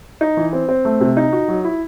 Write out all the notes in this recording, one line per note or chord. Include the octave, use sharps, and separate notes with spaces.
D#4
E3
C4
C4
A3
C3
D#4
F#4
F#3
E4